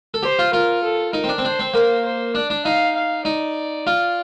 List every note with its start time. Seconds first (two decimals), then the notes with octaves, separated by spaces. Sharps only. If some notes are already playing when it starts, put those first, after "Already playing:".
0.14 A4
0.23 G4 C5
0.39 F4
0.53 F4 A#4
0.83 A4
1.13 D#4 A#4
1.24 C4
1.29 D4
1.38 C4
1.45 D4 C5
1.59 C4
1.74 A#3 C5
2.05 C5
2.35 D4 D5
2.50 D4
2.65 D#4 F5
2.95 F5
3.25 D#4 D5
3.87 F4